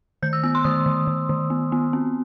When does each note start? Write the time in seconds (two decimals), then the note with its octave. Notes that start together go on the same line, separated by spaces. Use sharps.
0.23 D#3 G6
0.33 E6
0.43 B3 E6
0.55 C6
0.64 D#3 D#6
0.86 D#3
1.07 D#3
1.29 D#3
1.50 B3
1.72 B3
1.93 C4